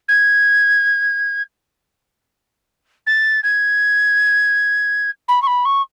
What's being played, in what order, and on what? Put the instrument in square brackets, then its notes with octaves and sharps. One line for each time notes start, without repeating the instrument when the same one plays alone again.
[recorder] G#6
A6
G#6
B5
C#6
B5
C#6